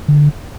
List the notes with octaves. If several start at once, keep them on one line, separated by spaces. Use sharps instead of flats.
D3